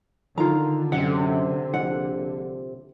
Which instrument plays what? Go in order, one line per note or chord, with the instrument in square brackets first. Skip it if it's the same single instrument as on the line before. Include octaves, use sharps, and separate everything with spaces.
[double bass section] D3 [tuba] D#3 [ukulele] F4 A#5
[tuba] F#2 [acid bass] C3 [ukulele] F#5
[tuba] A#1 [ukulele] F#5